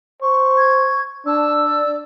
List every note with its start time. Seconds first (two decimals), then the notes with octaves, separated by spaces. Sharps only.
0.22 C5 C#6
0.57 G#6
1.26 D4 A5 E6
1.65 D5